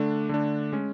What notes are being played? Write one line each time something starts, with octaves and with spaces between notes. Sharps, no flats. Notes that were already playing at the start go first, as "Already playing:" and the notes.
Already playing: D3 A3 D4
D3 A3 D4
G#3 C#4